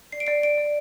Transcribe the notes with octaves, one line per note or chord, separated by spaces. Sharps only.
D5 C7
D7
D5 C7
D5 D7
D5